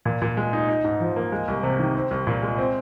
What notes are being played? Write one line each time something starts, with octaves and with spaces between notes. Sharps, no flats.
A#2
A#2
G#3
D#4
D#4
G#2
F3
A#3
G#3
C2
C3
D#3
C4
C2
A#2
G#3
C4